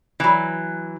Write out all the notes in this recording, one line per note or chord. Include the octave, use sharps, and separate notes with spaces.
E3 F#3